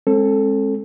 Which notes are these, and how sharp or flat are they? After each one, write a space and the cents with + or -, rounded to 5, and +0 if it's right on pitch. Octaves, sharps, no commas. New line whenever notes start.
G#3 +0 C4 +45 A4 +0